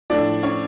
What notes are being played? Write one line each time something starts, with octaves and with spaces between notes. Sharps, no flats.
A2 F3 D4 D5
C#4 C#5